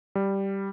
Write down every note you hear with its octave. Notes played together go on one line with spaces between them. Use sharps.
G3